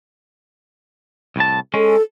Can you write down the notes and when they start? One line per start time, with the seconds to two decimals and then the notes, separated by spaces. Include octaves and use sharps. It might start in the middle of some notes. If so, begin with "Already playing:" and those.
1.36 C2 A2 A5
1.74 G#3 C#4 A4